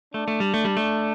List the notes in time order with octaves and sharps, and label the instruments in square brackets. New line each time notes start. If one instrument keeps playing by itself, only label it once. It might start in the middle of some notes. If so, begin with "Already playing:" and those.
[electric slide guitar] A3 [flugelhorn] D4
[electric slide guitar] A3
G3
A3
G3
A3